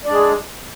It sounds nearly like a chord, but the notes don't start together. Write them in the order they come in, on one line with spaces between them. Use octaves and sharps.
D5 D4 G#3 G#4